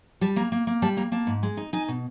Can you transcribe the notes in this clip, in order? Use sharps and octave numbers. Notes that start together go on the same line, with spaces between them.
G3 A5
A#3 A#5
A#3
A#3
G3 A5
A#3 A#5
A#3 A5
G#2
G#3
D#4
D#4 G#5
B2